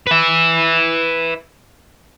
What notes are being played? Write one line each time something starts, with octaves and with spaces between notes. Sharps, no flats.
B4 E5